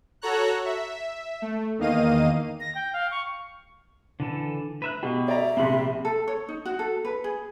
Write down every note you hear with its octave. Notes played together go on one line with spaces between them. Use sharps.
F#4 A4 C#5 A#5 F#6
E5
A3
E2 D#3 A#3 D#5 F5 D#7
A#6
G5
F5
C#6
D3 E3 A4
B4 E5 A#5 F#6
B2 G4 G#4 G5
D5 E5 A#5
A#1 C3 C4 B5
A4
C#5
D#4
F#4
A4
B4
G#4